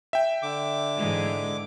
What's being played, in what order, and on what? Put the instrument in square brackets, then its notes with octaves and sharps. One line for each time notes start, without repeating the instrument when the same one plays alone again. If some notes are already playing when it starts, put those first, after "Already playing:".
[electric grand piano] E5 G5
[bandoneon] D3 D6
[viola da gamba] G#2 E3 G#3